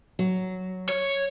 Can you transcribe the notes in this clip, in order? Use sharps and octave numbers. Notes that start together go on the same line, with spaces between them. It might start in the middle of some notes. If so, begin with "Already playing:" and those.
F#3
C#5